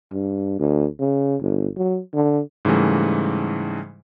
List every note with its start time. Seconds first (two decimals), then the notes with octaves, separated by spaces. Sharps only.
0.13 G2
0.59 D2
1.00 C#3
1.41 G1
1.77 F#3
2.14 D3
2.65 G#2 C#3 E3 G3 A3